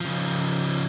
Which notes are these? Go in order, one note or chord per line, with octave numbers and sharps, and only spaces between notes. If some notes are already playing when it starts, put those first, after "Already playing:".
C#3 F3